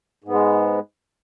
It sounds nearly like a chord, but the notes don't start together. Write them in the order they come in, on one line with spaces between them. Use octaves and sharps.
G#2 B3 G#3